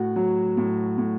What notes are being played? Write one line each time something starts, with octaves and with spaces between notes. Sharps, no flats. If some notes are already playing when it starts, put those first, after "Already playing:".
Already playing: A2 F#4
F#3
A2
A2